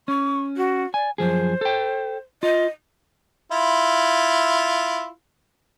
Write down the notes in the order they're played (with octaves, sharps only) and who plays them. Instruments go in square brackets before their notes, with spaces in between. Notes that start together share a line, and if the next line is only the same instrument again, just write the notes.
[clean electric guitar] C#4 [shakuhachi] C#6
[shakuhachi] F#4
[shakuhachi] D5 [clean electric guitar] G#5
[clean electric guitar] F#2 F3 G#4 [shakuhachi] C5
[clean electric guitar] A4 G5
[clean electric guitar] F4 [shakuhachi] D#5
[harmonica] E4 F4